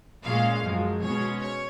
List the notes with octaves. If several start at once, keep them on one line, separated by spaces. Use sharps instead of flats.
A#2 G#3 C#4 F5
F#2 F3 G#3
B2 G#3 C#4 C#5
C#5